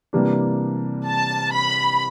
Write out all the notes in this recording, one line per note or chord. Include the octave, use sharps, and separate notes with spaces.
C3 E3 G3 A#3 D4
A5
B5